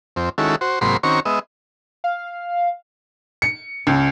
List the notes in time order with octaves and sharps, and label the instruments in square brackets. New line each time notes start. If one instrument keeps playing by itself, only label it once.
[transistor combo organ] F2 C4
D#3 G#3 C#4 E4 F#4 A4
F#4 C5
G#2 C3 F#3 A#3 B5 C6
D#3 C4 C#4 F#4 A#5 C#6
G#3 B3 D#5 E5
[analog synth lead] F5
[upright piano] C#7
C#2